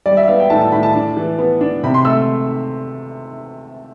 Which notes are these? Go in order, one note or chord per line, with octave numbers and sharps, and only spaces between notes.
G3 D5
E5
B3 F5
G5
A2 A5
A5
A2 B5
A5
D4
E3
B3
D4
C3 B5
C6
A3 E6